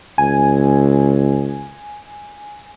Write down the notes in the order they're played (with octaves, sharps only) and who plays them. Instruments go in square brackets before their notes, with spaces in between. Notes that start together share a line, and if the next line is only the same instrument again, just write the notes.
[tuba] C#2 [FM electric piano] G#5